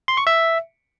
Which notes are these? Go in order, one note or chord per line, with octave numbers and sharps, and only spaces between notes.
C6
C#6
E5